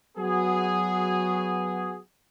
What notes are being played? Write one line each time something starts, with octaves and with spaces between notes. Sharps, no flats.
F#3 B3 F#4 G#4